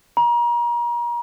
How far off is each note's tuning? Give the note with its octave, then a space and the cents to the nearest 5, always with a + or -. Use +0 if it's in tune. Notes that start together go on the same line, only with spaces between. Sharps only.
A#5 +35